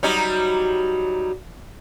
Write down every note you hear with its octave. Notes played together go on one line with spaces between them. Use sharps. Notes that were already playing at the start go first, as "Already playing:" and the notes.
F#3 G3 D#4